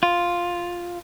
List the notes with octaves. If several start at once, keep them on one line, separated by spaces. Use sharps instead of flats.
F4